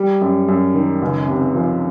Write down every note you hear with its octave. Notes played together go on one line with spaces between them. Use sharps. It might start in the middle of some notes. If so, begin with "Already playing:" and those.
Already playing: G3
F#2
F#2
D#3
C#2
C3
F3